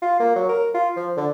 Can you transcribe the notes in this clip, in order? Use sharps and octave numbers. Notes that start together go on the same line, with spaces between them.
F4
A#3
F#3
A#4
F4
F3
D3